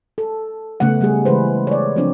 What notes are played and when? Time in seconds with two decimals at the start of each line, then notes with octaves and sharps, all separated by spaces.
0.18 A4
0.80 C#3 A3 B3 F#5
1.01 G3 A3 G#4
1.25 C#3 E3 G#3 B4 C5
1.67 C#5 D5
1.96 F3 C4 D4